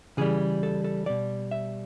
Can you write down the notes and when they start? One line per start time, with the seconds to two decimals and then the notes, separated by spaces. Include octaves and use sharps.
0.17 C#3 E3 G3 G#4
0.63 A4
0.84 A4
1.06 B2 G3 D5
1.51 E5